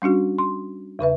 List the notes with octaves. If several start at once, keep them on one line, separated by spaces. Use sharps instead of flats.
G3 C#4 D4 F#4
C6
E2 C#3 B4 E5